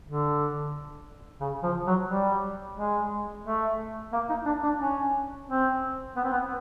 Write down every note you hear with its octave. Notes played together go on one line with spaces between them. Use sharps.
D3
C#3
F3
F#3
G3
G#3
A3
A#3
D#4
D4
D4
C#4
C4
B3
C4
B3